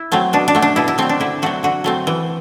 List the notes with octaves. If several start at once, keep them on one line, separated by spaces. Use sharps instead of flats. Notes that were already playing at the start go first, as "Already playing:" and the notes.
Already playing: E4
F#3 A3 C4
B2 D4
D4
F#3 A3
D4
B2 E4
E4
F#3 A3 C4
D4
D3 E4
F#3 A3 C4 F#4
D3 F#4
F#3 A3 C4
E3